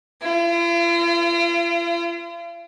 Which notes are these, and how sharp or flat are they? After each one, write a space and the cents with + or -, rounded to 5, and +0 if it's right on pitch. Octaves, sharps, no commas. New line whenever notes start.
F4 -45